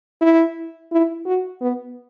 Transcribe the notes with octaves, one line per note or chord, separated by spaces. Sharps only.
E4
E4
F#4
B3